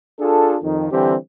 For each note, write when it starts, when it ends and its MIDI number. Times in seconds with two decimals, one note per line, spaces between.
0.20 0.56 62
0.20 0.56 65
0.20 0.56 68
0.20 0.56 69
0.63 0.88 41
0.63 0.88 51
0.92 1.15 50
0.92 1.15 52
0.92 1.15 55
0.92 1.15 60
0.92 1.15 67